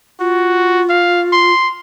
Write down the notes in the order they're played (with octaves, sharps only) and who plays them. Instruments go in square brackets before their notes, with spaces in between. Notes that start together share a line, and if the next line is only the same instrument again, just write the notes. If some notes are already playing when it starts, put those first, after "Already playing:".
[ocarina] F4 [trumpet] F#4
[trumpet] F5
C6